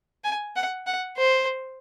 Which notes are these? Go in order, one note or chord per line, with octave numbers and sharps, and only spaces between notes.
G#5
F#5
F#5
C5